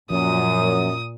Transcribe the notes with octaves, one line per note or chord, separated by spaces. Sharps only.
F#2 A#2 F3 D#6